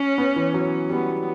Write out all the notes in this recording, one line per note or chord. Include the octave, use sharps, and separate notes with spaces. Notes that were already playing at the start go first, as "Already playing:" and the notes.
Already playing: C#4
B3
E3
F#3
G3 B3